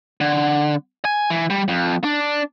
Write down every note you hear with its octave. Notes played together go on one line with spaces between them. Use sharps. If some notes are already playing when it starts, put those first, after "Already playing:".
D3
G#5
E3
G3
F2
D4